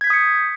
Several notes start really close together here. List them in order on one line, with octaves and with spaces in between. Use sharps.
G#6 B6 G6 D#6 C#7